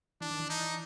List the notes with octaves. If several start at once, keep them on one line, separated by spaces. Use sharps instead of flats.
E3 D4
D#3
E3
D#4